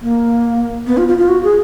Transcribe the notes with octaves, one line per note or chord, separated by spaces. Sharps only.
A#3
B3
F4
F4
F4
F#4
G#4